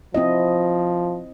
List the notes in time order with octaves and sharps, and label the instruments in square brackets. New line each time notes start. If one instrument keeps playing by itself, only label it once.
[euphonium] F3 [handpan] C4 E4 D#5